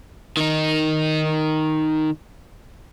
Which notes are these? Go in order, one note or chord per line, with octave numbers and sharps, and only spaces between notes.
D#3 D#4